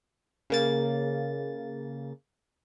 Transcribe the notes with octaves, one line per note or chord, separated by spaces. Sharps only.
C#3 A#3 A6